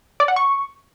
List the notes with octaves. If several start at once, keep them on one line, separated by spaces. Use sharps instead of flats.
D5
F#5
C#6